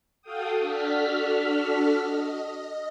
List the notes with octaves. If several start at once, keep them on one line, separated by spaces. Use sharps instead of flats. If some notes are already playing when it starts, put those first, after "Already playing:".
F#4 A4 F5 G5 D#6
D4 F#4 A4 F6 B6
D#5